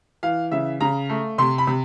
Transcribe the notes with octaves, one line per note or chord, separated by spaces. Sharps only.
E3 F5
C#3 E5
C#3 A#5
A3
C3 C6
B5
C3